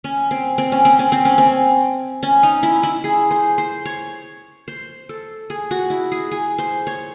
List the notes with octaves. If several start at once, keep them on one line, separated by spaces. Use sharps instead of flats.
C#4
C4
C4
C#4
C4
C#4
C4
C#4
C4
C#4
D#4
E4
E4
G#4
C5
C5
C#5
C5
A4
G#4
F#4
E4
G#4
G#4
C5
C#5